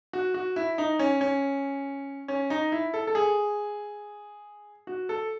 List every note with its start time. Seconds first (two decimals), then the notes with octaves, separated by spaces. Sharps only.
0.13 F#4
0.34 F#4
0.56 E4
0.78 D#4
0.99 C#4
1.21 C#4
2.28 C#4
2.50 D#4
2.72 E4
2.94 A4
3.07 A4
3.15 G#4
4.87 F#4
5.09 A4